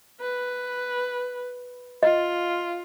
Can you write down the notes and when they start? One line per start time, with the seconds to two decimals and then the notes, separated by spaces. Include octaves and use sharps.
0.21 B4
2.03 F4 D#5